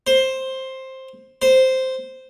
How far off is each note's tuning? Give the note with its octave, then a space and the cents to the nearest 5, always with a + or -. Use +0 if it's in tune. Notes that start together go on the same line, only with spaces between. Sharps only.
C5 +10
C5 -5